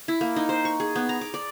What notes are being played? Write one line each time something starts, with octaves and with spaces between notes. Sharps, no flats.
E4
A#3
D#4
C5
C#6
G#4
B3
A#5
D6
D5